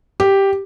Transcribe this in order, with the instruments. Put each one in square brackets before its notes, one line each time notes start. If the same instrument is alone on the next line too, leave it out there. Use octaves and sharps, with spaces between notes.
[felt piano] G4